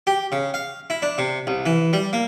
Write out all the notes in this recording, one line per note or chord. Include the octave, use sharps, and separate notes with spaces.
G4
C#3
F5
E4
D4
C3
C2
E3
G3
A#3